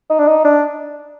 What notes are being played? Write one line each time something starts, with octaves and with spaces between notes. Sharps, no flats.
D#4
D4
D#4
D4